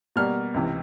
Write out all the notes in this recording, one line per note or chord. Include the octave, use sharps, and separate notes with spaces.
B2 G3 A#3 F6
C#2 C3 E3